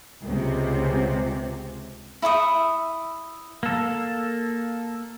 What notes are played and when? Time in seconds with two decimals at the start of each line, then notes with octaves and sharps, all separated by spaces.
0.23 C#2 C3
2.22 E4 E5 C#6 D#6
3.63 A#3 A4